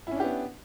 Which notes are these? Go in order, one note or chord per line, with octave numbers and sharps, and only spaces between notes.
B3 C#4 D4 E4 G4